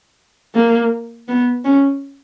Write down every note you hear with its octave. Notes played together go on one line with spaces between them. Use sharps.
A#3
B3
C#4